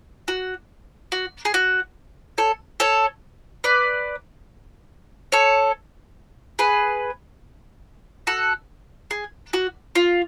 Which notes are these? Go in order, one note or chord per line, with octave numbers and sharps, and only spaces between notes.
F#4
F#4
G#4
F#4
A4 C#5
A4 C#5
B4 D5
A4 C#5
G#4 B4
F#4 A4
G#4
F#4
F4